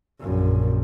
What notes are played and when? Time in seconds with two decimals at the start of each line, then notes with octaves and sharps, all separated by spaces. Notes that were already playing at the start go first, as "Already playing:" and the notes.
0.20 A#1 F#2